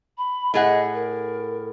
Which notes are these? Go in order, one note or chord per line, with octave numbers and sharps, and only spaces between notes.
B5
A2 G#4 D#5 F#5
A#4